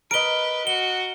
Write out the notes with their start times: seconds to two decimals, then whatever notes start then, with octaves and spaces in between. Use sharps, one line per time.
0.11 A#4 B4 D#5 D7 G7
0.67 F#4 G7